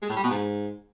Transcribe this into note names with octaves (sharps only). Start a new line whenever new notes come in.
G#3
A2
G3
B2
G#2